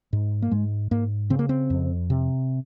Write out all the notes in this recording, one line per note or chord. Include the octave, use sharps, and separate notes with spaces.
G#2
A#3
G#2 G#3
G#2 A#3
C#3 C4
A#3
C4
F2
C3